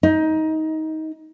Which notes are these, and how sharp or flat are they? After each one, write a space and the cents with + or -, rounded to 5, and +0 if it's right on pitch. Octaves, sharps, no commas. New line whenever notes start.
D#4 +20